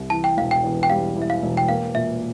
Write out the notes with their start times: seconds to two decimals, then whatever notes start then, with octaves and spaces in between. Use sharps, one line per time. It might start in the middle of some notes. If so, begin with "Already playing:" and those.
Already playing: C2
0.10 E3 A5
0.24 G5
0.37 E1 F5
0.51 G5
0.64 E2
0.83 G5
0.90 G3 F5
1.16 E3
1.22 E5
1.30 F5
1.43 E1
1.57 G5
1.68 A#3 F5
1.95 A#2 E5